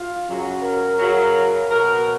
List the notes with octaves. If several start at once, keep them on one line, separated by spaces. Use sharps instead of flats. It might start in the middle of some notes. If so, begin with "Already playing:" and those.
Already playing: F4
F#2 C#3 F#3
A#4
F#2 C#3 F#3
B2 F#3 A#4